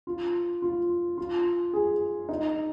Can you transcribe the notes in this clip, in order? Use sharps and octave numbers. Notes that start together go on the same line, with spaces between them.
F4
F4
F4
G#4
D#4